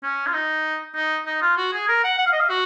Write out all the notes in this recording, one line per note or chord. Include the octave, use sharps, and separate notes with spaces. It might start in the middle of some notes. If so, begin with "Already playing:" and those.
C#4
F4
D#4
D#4
D#4
F4
F#4
G#4
A#4
F#5
F#5
F5
D#5
F5
F#4